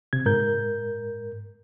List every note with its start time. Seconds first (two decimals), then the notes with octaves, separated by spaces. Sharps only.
0.13 C3 G#6
0.26 G#2 A#4 G6